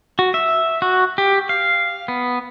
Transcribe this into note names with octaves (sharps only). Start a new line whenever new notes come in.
F#4
E5
F#4
G4
F5
B3